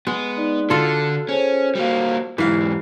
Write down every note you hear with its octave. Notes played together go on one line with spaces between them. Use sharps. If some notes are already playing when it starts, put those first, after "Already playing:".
G#3 B3
D#4 D5
D3 F4 F#4 A4
C#4 G#4 C5
G3 A#3 F#4 C5 F5
E2 G#2 E3 E4 G4 F5